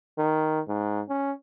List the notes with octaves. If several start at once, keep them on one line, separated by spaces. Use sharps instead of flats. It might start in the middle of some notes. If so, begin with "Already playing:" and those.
D#3
G#2
C#4